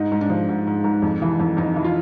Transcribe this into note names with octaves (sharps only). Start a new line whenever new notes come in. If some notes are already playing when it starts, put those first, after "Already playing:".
Already playing: G#2 D#4
G#2
D4
F3
G#2
G#2
G#2
F2
E3
F2
F2 D#4
E3
F4